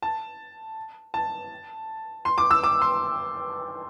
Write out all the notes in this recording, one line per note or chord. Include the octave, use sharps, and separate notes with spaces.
A5
A5
C6
D6
E6
D6
C6